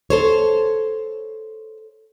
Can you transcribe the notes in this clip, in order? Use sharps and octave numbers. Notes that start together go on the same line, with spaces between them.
A4 C5 C#5